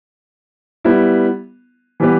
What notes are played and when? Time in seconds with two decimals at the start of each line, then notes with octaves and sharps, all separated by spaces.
0.84 G3 B3 E4
2.00 E3 G3 B3 G4 B4